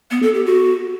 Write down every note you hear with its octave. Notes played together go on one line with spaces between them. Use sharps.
B3
A4
G4
F#4